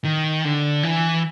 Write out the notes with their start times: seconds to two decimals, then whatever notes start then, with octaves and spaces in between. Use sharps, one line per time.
0.04 D#3
0.45 D3
0.83 E3